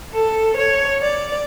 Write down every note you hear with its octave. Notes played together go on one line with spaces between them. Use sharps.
A4
C#5
D5